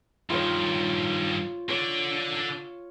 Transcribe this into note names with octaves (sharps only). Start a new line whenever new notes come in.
G2 D#3 F4 C5 C#5
D3 D4 C#5